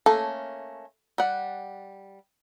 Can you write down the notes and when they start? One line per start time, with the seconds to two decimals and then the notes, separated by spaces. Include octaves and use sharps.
0.06 A3 A#3 C#4 A4
1.18 G3 F#5